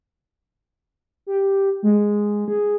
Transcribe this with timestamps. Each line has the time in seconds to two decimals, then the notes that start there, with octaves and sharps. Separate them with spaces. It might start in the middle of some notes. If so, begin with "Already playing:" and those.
1.26 G4
1.83 G#3
2.48 G#4